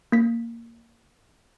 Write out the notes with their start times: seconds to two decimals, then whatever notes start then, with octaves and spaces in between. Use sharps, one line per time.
0.12 A#3 B6